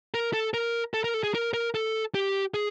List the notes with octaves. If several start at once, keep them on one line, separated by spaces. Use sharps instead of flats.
A#4
A4
A#4
A4
A#4
A4
G#4
A#4
A#4
A4
G4
G#4